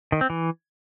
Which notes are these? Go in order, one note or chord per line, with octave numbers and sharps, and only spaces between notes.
D#3
C4
E3